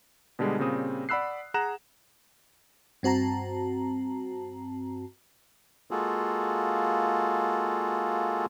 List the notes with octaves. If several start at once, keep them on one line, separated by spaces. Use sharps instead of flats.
B2 D3 G3 G#3
A#2 C#3 G3 C4 D#6
D5 F#5 B5 E6 F#6 C7
G#4 F#5 A#5 F#6 E7
G2 C4 F#4 A5 A#5
G#3 A#3 F4 F#4 G#4 A4